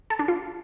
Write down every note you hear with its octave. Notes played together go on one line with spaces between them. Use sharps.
A4
D4
F4